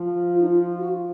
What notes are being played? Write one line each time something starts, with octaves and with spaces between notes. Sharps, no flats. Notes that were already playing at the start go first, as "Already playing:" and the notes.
Already playing: F3
F4
D#4
F4
F#4